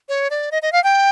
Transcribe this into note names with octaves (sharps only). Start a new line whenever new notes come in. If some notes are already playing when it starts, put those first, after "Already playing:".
C#5
D5
D#5
D#5
F5
G5